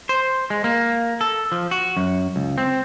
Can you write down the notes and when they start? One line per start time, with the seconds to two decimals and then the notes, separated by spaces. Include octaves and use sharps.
0.09 C5
0.50 G#3
0.64 A#3
1.21 A4
1.52 F3
1.71 F#4
1.97 F#2
2.36 C#2
2.58 C4